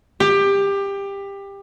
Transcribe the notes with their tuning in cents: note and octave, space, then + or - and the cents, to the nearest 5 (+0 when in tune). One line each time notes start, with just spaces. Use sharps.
G4 +20